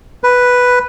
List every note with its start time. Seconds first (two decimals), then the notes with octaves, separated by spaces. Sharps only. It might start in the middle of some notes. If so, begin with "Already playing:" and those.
0.24 B4